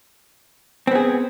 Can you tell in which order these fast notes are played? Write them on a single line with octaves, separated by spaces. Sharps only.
C4 B3 G#4